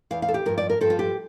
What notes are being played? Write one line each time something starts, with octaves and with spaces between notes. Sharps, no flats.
E2 E3 F5
F5
A4
G4
G2 F3 A#4
D5
A#4
G2 F3 A4
F4
G4